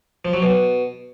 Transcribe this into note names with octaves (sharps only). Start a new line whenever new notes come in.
F3
F#3
B2